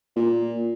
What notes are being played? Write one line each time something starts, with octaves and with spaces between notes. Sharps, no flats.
A#2